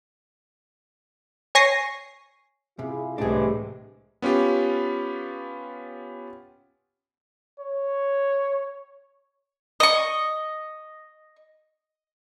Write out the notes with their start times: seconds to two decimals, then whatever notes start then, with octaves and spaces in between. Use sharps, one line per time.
1.55 C#5 G#5 C#6 A#6 C7
2.79 C3 E4 F4 G#4
3.18 C2 A2 C3 E3 G#3 D4 G#4
4.22 B3 C#4 F4 G4
7.60 C#5
9.80 D#5 C#6